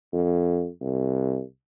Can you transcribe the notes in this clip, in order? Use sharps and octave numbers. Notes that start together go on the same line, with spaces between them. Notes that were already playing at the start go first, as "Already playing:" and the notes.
F2
C2